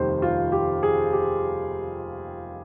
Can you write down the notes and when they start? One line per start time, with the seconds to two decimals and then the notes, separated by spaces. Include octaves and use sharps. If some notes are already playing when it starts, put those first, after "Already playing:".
Already playing: F1 D#2 D#3 G3 C5
0.22 F4
0.52 G4
0.83 G#4
1.13 G4